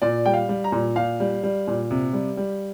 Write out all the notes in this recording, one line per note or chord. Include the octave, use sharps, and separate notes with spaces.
A#2 D5
G3 G5
F5
G3
A#5
A#2
A#2 F5
G3
G3
A#2
C3
G3
G3